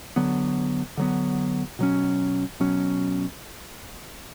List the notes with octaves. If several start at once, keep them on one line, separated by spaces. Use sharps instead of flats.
D3 F#3 B3
D3 F#3 B3
B2 F#3 C#4
B2 F#3 C#4